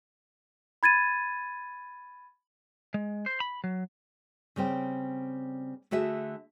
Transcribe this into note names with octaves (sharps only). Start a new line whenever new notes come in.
B5 G#6 A6 D#7
G#3
C5
B5
F#3
C#3 G3 C4 G5
D3 A3 F#4 G#4 E5